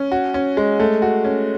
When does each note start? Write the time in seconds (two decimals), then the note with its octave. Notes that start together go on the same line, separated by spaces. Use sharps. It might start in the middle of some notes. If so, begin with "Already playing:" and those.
Already playing: C#4
0.12 F#4
0.34 C#4
0.57 G#3
0.80 A3
1.02 F#4
1.25 C#4